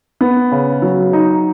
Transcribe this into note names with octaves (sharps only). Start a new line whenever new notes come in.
B3
C#3
F#3
D#4